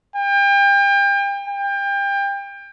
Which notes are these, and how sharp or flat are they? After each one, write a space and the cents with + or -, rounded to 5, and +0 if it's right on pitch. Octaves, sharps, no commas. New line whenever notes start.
G5 +35
G5 +30